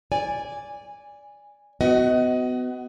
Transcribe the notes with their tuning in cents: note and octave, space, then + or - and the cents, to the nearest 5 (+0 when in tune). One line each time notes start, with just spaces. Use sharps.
D5 -10 G#5 -10
B3 +25 F#4 +10 D#5 +20